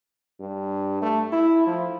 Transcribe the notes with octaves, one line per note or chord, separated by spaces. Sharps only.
G2
A3
E4
F3